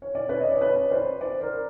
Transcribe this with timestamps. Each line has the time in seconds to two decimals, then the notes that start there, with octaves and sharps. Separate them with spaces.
0.02 C#5
0.15 D5
0.29 B4 C#5
0.41 D#5
0.52 D5
0.61 B4 C#5
0.91 C5 D5
1.21 C5 D5
1.41 A#4 C5